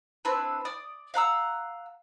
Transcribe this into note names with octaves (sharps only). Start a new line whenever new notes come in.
C4 D4 E4 B4
D5 D#6
F5 F#5 A#5 E6